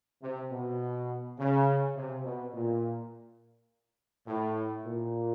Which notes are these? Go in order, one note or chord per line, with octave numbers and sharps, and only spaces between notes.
C3
B2
C#3
C3
B2
A#2
A2
A#2